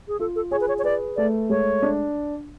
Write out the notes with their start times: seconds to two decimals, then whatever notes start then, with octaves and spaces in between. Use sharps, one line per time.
0.08 G#4
0.19 F4 A4
0.36 A4
0.51 G#4 C#5
0.61 B4
0.68 C#5
0.79 C#5
0.84 B4 D5
1.17 A3 D5
1.49 G#3 C#5
1.82 D4